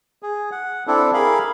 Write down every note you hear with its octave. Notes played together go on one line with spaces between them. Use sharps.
G#4
F#5
C4 D4 E4 A4
G#4 A#4 F5 B5